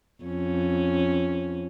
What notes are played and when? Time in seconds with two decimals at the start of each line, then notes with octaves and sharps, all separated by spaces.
0.23 F2 C#4